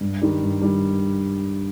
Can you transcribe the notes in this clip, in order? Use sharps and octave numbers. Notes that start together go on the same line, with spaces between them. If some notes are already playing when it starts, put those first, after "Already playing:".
G2
D#3 G3
G2
D#3 G3